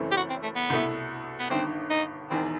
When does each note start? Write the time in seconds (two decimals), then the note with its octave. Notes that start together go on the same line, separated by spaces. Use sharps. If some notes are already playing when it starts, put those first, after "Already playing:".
Already playing: F#1 F#2 E3 A3 C4
0.11 G4
0.17 F#4
0.30 C4
0.43 A3
0.56 B3
0.70 C2 B2 A3 E4
1.39 B3
1.50 G1 G2 D#3 C4
1.90 D#4
2.30 E1 E2 D#3 C4